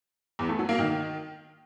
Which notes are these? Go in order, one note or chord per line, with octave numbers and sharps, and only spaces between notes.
E2
A3
F#3
A#3
D#3